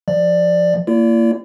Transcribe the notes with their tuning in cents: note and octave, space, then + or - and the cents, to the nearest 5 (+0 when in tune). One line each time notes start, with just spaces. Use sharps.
F3 +0 D5 +10
A#3 -20 E4 +40 D5 -25